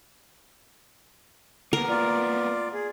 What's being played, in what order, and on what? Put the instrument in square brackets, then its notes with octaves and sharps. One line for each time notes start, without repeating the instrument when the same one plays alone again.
[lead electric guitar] A#3 B3 [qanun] A#4
[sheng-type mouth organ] F4 D5
G#4